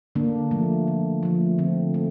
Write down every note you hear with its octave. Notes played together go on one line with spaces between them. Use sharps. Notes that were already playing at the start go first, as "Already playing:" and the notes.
D3 A#3 D4
F3 A3
D3
F3 A3
D3 C4
A3